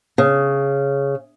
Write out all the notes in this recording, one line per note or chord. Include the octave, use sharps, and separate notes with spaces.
C#3